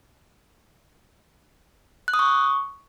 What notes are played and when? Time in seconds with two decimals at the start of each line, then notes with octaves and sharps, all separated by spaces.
2.08 F#6
2.14 D#6
2.19 C#6